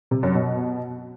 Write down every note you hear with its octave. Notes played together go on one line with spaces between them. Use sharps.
C3
F#2
B2